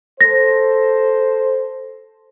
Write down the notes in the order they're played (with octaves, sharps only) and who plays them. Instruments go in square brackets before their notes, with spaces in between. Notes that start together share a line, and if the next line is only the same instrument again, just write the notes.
[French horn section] A4 C5 [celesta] A#6